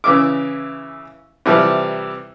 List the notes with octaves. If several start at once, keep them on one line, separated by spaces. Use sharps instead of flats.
C#3 E3 E5 D6
C3 E3 F3 G3